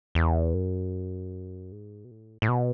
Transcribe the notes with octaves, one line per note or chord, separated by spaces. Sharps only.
E2
F#2
G#2
B2
A2
A2
B2